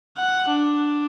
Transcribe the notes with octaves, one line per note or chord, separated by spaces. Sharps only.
F#5
D4